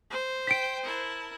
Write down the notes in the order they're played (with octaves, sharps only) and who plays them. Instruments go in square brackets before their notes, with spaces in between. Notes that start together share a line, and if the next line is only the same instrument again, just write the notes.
[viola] C5
[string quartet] G5 [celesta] B6 D7
[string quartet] E4 A#4 A5